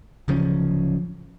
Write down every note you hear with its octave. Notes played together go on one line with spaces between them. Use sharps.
D1 C#3 F3 C#4